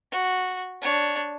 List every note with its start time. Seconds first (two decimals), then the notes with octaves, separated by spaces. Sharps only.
0.12 F#4
0.81 D4 C#5